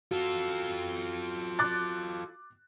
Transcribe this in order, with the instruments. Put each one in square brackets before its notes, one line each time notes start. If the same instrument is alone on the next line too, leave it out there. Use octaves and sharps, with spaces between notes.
[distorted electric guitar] F4 A4 [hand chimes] F#4
[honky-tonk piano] D6 F#6 A6